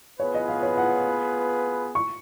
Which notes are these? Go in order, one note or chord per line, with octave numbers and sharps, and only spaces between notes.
B3 F4 G#4 B4 C#5
D#5
F5
C#5
F#5
C#6